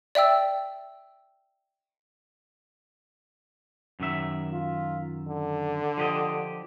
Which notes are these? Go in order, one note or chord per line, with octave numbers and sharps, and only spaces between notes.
D5 E5 G5 E6
F#2 D#3 E5
F4
D3
F3 G4 D#5